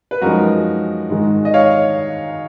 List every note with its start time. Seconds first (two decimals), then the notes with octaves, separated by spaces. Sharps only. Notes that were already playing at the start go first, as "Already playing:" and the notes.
0.11 B4
0.21 F#2 F3 G#3 D#4 F#4 A#4
1.10 G#2 D#3 G#3
1.45 D#5
1.54 C#5 F5